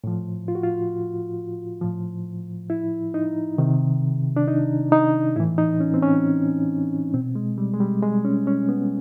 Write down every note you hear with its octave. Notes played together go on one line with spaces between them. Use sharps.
A2 F3
F4
F#4
F4
A2 F3
E4
D#4
C3 D#3
D4
D#4
D#4
A2 E3 E4
D#4
C#4
C4
C#4
B2 C4
G#3
G3
G#3
G3
G#3
C#4
C#4
B3